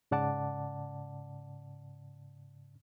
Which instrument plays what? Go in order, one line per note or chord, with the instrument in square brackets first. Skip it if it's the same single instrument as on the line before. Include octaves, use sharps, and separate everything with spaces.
[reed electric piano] G#2 C#3 D5 F#5 A5 D6